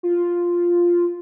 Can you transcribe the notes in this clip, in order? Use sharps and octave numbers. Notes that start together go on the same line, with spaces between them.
F4